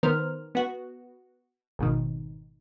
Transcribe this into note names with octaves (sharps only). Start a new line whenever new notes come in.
D#3 B3 A#4 C5 F6
B3 F#4
G#1 G#2 B2 D#3